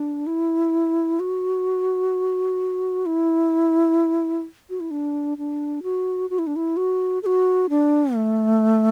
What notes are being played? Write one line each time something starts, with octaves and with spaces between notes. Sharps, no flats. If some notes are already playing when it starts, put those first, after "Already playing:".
Already playing: D4
E4
F#4
E4
F#4
E4
D4
D4
F#4
F#4
E4
D4
E4
F#4
A4
F#4
D4
A3